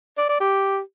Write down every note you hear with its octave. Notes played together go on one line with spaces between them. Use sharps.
D5
D5
G4